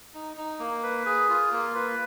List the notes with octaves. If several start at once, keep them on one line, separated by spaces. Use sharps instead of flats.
D#4
D#4
A#3
B4
G#4
F4
A#3
B4